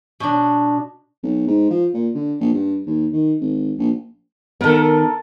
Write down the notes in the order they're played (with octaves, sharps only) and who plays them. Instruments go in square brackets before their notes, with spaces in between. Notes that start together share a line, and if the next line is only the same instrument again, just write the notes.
[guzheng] B2 D4
[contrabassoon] B1
G#2
F3
A#2
D3
A#1
G2
D#2
D#3
G#1
A#1
[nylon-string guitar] D#3 B3 [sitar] A4 A#4